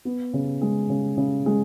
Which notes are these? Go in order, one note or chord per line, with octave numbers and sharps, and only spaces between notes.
B3
C#3
G#3
C#3
C#3
G#3